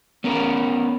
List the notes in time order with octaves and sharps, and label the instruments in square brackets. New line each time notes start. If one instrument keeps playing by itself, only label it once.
[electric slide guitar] B3 C#4 A#4